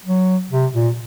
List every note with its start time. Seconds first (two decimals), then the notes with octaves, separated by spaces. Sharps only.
0.05 F#3
0.51 C3
0.73 A#2